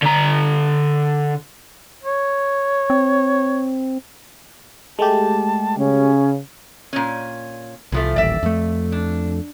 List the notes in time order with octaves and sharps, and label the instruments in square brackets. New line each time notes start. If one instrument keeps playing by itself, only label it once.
[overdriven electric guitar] D3 A#5
[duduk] C#5
[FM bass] C4
[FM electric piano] G#3 A3 G4 [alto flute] A5
[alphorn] C#3 [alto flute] C#4
[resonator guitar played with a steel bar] A#2 C#4
[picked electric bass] C2 [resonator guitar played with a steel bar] E3 F3 A3
[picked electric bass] D#1 A1 [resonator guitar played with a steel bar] D5 E5
[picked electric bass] F2 A3
[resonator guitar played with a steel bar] D4